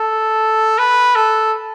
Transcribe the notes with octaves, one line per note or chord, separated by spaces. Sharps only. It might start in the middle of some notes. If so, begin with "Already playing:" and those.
Already playing: A4
B4
A4